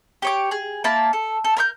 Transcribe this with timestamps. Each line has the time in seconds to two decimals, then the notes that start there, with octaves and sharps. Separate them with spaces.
0.22 G4 C#5 D6
0.51 G#4
0.84 A#3 E4 A5 B5
1.13 A4
1.44 A4
1.57 A#4 B5 G6